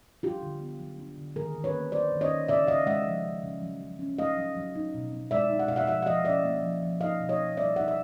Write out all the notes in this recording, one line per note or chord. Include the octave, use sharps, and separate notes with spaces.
D4 F4 G4
D3
B3
F#3
D4
D3
D#3 G#4 A#4
D#3
B4 C#5
A#3
F#3 C5 D5
D#3
C#5 D#5
D#3
C#3 D5 E5
C#3 D#5 F5
G#3 E5 F#5
F3
C#3
C#3
F#3
F#3
C#4
A3 D#5 F5
F#3
F#3
D#4
B2
C4
G#3 D5 E5
D#4
F#5
B2 F5
E5 F#5
F3 E5 F#5
F#5
F3 D#5 F5
C#4 D5 E5
A#3
F3
F3
D#4 D#5 F5
B2
C#5 D#5
C4
G3 D5 E5
D#4 E5 F#5
E5